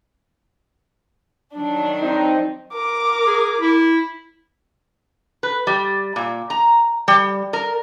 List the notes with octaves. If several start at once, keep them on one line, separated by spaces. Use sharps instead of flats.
D#3 F#3 D4
C4 D#4
A#4 D6
G#4
E4
B4
G3
A#2
A#5
G3
A#4